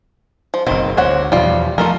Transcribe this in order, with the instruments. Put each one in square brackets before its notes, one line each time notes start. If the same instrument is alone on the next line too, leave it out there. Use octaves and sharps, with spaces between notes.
[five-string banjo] F3
[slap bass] F#1 B2 [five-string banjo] D#3 C4
[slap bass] D2 [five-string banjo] C5 C#5 F#5
[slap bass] E2 B2 F3 [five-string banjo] G3 F4
[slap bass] F3 A3 [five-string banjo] F4 A4 A#4